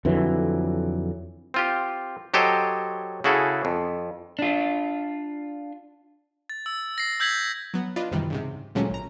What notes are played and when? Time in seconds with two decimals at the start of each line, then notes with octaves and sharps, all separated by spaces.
0.05 F2 D3 E3 F#3
1.54 C4 F4 G4
2.34 F#3 G4 A4 C5 C#5 D#5
3.24 C#3 E4 F#4 G#4 A4
3.65 F2
4.39 D4 F4
6.50 A6
6.66 E6
6.98 A#6 C7
7.20 E6 G6 G#6 B6 F#7
7.74 F#3 B3
7.96 D4 F4 B4 D#5
8.11 F#2 C3 D#3 E3 G3
8.30 C#2 G#2 C3
8.75 D2 A#2 F#3 G#3 A3 C#4
8.90 G#1 A#5